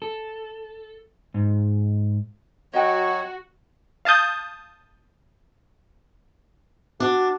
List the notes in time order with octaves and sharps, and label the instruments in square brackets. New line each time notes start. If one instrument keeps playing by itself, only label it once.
[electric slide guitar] A4
G#2
[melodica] F#3 C#5 [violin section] F#4 [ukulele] D#5 G5
[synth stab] F5 A5 D#6 G6
[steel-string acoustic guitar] D4 [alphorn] F#4